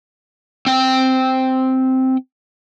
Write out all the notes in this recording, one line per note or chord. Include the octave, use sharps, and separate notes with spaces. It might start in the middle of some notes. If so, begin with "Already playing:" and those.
C4 G5